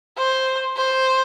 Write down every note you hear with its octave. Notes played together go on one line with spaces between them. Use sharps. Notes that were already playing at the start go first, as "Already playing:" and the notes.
C5
C5